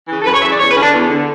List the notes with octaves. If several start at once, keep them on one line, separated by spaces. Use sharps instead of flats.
C#3 E3
A4
F#2 B4
C#5
C#3 E3 E5
D5
E2 C#5
B4
D3 C#4
D4
E2
D3